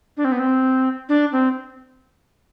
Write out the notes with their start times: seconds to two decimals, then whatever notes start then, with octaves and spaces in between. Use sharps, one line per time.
0.17 D4
0.24 C4
0.32 B3
0.40 C4
1.09 D4
1.32 C4